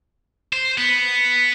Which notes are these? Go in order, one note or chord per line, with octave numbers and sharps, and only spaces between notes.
C5
B3